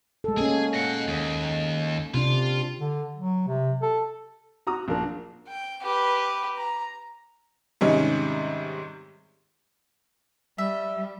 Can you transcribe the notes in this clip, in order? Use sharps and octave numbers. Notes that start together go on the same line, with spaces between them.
G#3 A4
A#3 C#4 G#4
D#5 F#5
D#2
C3 D4 F4
D3
F#3
C3
A4
F#4 A#5 D#6
A#1 D4 A#4
G5
G4 B4
A#5
G#2 C3 D#3 G3 C#4 D#4
G3 E5